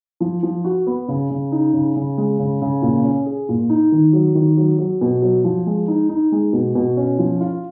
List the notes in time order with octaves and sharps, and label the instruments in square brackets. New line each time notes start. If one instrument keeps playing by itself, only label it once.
[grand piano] F3
F3
F#4
B3
C#3
C#3
D#4
C#3
C#3
G#3
C#3
C#3
A#2
C#4
G#4
A#2
D#4
D#3
F#3
D#3
F#3
F#3
B2
F#3
F3
G#3
D#4
D#4
G#3
B2
B2
C#4
F3
F4